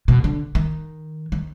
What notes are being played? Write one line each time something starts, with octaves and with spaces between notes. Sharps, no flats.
B2
D3
D#3
D#3